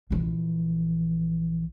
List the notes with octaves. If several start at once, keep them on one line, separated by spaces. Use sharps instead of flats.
A#1 E3